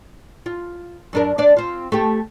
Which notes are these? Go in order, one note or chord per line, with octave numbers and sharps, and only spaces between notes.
F4
F#2 D4 A#4
D4 C5 D5
C4 F4
A3 G4